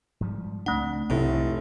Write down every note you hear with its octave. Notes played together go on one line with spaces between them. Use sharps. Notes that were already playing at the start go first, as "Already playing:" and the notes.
G#2 F3 G3
C#2 A3 C4 D4 F#5
F1 C2 A2 F#3